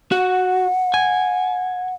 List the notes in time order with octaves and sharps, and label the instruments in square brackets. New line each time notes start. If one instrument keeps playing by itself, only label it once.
[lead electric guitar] F#4 [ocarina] F#5
[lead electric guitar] G#5